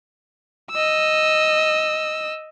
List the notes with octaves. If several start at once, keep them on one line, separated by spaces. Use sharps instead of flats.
D#5 E6